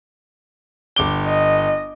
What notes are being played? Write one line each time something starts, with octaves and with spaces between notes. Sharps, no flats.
G1 D6 G7
D#5